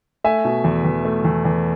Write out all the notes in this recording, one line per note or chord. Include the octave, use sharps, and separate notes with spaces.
A3 E5 G#5
B2
E2
E2
A3
E2
E2